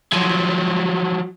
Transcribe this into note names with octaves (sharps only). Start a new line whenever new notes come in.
F3 F#3